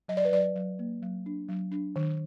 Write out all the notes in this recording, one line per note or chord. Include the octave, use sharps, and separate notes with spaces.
F#3 D#5
D5
B4
F#3 D5
F#3
A#3
F#3
D4
F#3
D4
D#3